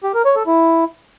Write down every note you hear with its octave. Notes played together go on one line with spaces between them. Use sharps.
G4
A#4
C#5
A4
E4